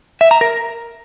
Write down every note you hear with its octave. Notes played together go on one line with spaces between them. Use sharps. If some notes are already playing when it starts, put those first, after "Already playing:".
E5
A#5
A#4